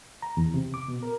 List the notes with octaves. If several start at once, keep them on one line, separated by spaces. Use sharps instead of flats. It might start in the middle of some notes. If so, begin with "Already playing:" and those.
A#5
E2
C3
D6
B2
A#4